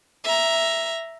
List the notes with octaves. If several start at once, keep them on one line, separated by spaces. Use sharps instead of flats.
E5 A#5